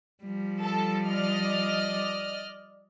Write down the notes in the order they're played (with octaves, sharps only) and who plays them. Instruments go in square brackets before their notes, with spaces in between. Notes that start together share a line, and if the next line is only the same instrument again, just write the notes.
[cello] F3 G3
[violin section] A4
D5 D#5 F6